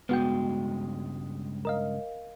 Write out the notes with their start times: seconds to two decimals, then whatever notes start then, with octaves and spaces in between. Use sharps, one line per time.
0.09 C#2 G2 G#3 B3 F#4 G5
1.65 A#4 D#5 F5